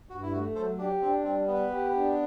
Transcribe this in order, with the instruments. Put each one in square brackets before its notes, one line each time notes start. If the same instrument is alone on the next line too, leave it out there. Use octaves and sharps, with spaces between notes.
[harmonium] G2 [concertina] F#4
[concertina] E4
[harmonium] A3 [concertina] F#4
[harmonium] F#3 [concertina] A4 C5
[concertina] D4 [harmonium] G4
[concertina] C4 [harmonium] D4
[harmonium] G3 [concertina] C4
[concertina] B3 [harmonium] B4
[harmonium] G4
D4